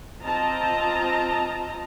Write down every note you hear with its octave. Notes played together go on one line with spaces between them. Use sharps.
C4 F4 D#5 A5 A#5